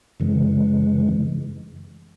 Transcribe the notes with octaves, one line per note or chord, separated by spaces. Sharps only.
F#2 C#3 E3 G#3